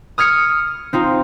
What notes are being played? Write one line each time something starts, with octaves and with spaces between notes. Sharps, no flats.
D#6 F6 G#6 C#7
C4 D#4 F4